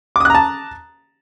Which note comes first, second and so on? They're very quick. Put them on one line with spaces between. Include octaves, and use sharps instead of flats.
D6 D#6 F#6 A#5 A5